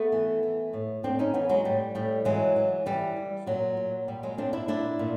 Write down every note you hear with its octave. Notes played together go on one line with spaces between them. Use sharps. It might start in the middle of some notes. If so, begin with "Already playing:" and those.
Already playing: A3 B3
E3
E3
A2
A2 C4 D4
C#4 D#4
E3 B3 C#4
F#3 G#3
A2 G3
A2 G3
E3 F#3 G#3
E3
E3 G3
E3
A#2 F#3
A#2
A#2 G3
F#3 G#3
A#2 C4 D4
D4 E4
A#2 D4 E4
A#2